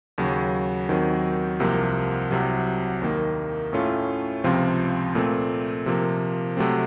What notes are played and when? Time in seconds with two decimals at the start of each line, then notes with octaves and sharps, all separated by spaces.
0.18 D#2 C#3 F#3
0.89 D#2 D#3 F#3 C4
1.60 C2 C3 F3 A#3
2.31 C2 C3 F#3
3.02 D#2 D#3 A#3
3.73 A2 A3 C#4 F4
4.44 C#2 C3 F3 C4 F4
5.15 A#2 A3 C4
5.86 C3 F3 A#3
6.57 C3 F#3 A3 C4